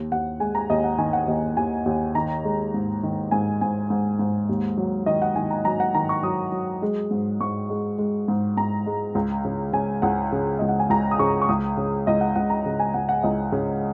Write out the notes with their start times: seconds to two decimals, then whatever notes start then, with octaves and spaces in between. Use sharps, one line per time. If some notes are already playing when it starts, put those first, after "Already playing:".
Already playing: D#2
0.12 D#2 F#5
0.40 G#3 G#5
0.55 A#5
0.70 D#2 D#5
0.84 F#5
0.98 D#3 G#5
1.13 F#5
1.28 D#2 D#5
1.57 D#2 G#5
1.86 D#2
2.15 D#3 A#5
2.44 G#3
2.74 G#2
3.03 D#3
3.31 G#2 G#5
3.61 G#2 G#5
3.90 G#2
4.19 G#2
4.49 D#2
4.77 F#3
5.06 D#3 D#5
5.22 F#5
5.36 D#3 G#5
5.51 A#5
5.65 F#3 A#5
5.80 F#5
5.95 D#3 A#5
6.09 C#6
6.23 F#3 D#6
6.52 F#3
6.82 G#3
7.11 G#2
7.41 G#2 C#6
7.70 G#3
7.99 G#3
8.28 G#2
8.57 G#2 A#5
8.86 G#3
9.15 C#2
9.44 C#3
9.73 C#3 G#5
10.02 C#2 F#5
10.32 C#3
10.59 C#2 D#5
10.69 F#5
10.80 G#5
10.90 C#2 A#5
11.11 D#6
11.19 C#3 C#6
11.42 C#6
11.49 C#2 D#6
11.77 C#3
12.07 C#2 D#5
12.21 F#5
12.36 C#2 F#5
12.50 A#5
12.66 C#3
12.80 G#5
12.94 C#2 F#5
13.09 F#5
13.23 C#2 D#5
13.52 C#3